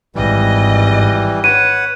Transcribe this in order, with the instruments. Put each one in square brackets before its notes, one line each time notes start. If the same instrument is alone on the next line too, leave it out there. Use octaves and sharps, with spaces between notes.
[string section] G#1 D#5 [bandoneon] E3 G3
[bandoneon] B4 C#5 F#5 [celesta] D#7